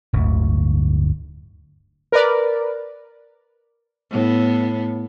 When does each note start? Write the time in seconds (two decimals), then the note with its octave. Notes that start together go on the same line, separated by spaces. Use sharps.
0.13 D1 G1 D2
2.12 A#4 B4 D5
4.11 A2 B3